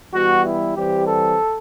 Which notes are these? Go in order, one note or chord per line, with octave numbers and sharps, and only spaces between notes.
E3 G3 B3 F#4
E4
E3 G3 C4 G4
A4